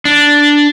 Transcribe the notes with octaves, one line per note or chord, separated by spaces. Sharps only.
D4